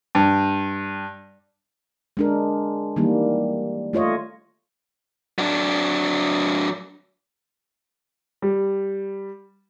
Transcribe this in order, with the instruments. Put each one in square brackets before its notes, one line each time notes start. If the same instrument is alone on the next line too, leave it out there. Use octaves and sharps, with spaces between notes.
[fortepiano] G2
[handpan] G#3 D4 A#4
D#3 E3 G3 A#3
A3 F4 C#5 D#5
[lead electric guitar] F#3 D4
[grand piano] G3